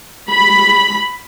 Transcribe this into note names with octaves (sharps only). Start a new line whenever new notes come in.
B5